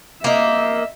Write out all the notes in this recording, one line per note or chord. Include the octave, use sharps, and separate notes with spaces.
A#3 D#4 E5